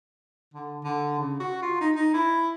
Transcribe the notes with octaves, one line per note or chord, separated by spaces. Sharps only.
D3
D3
C#3
F#4
F4
D#4
D#4
E4